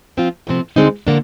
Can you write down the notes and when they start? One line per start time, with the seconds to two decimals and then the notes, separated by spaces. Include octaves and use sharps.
0.17 F3 C4 F4
0.47 D2 C3 F3 C4
0.76 D2 D3 G#3 C4 D#4
1.07 D3 F3 A#3 D4